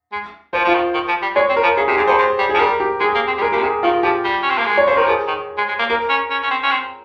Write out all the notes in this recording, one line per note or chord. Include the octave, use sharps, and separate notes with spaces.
G#3
F3 C5
F3 F4
D#3
D#3
F3
G3
G#3 C#5
C4
A#4
F3
C#3 G#4
C3 G4
G#2 G#4
G2 C5
G#2
G3
F3 G#4
G3 A#4
G4
G#3 G#4
A#3
C4
G3
G#3 A#4
C#3 G4
A#2
C3 G#4
D#3 F4
F3 G4
G3
C#4
C4
A#3
G#3
C#5
C#3 C5
D#3 A#4
F3 G#4
D#3
G#3
G#3
A#3
A#3 A#4
C#4
C#4
C#4
C4
C#4
C4